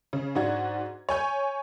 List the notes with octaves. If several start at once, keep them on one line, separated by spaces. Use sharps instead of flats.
C#3
G#2 D4 F#4 G#6
C#5 G#5 G6